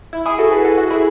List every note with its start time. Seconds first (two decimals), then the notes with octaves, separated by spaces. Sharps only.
0.13 E4
0.26 E4 G#4
0.39 F#4 A4
0.52 G#4 B4
0.65 F#4 A4
0.78 F#4
0.90 E4 G#4